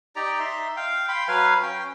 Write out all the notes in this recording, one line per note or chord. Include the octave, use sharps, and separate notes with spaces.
D#4 G4 D5 A#5
D#4 E5 C6
F5 G5
G5 B5 C6
F#3 B4 F5 G#5
C#4 G5